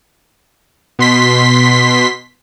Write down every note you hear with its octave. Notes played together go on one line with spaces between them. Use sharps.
B2 C6 B6